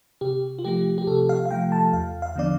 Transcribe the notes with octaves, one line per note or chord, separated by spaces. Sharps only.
C3 G4
F4
F3 A3 G4
G4
C3 A4
F5
F5
F3 A3 G5
A5
E2 F5
F5
D3 F3 B3 D4 D5